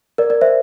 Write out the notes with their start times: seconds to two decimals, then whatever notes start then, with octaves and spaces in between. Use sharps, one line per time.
0.18 A#4 D5
0.30 A#4 D5
0.41 C5 E5